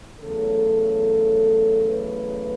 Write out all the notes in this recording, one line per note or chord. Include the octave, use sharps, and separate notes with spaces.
E2 C#3 F#3 A3 A4
B4